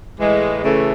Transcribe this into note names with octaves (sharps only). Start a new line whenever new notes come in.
A2 E3 G#3
C#3 E3 A3